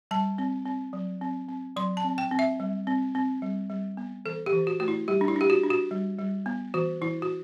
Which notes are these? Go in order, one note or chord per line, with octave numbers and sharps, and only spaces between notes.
G3 A5
C4
C4
F#3
C4
C4
F#3 C6
A5
C4
G5
C4
E5
G3
C4
C4
G3
G3
B3
E3 A4
G4
E3
F#4
A3 F#4
E4
G3 G4
D4
E4
D4 G4
F#4
D4
F#4
G3
G3
B3
E3 F#4
E3 E4
F#4